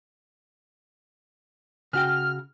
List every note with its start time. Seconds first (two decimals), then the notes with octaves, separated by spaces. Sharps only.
1.93 C#3 F#4 G5 F6